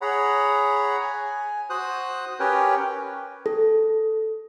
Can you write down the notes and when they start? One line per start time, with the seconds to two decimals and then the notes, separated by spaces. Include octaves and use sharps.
0.01 G#4 C#5 F#5 A#5 B5
1.01 G#5
1.70 F#4 C5 D#6 F#6
2.40 C#4 G4 A#4 B4 C#5 G5
3.46 A4